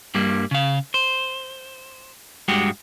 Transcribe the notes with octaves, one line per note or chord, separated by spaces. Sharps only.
G2 G3 A#3
C#3 F5
C5
G2 G#3 F#4 G4